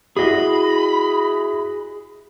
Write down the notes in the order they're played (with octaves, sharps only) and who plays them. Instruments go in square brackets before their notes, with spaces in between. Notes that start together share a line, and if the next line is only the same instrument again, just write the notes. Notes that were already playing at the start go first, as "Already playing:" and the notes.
[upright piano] E4 F#4 [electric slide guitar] G#4 D#5 [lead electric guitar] B5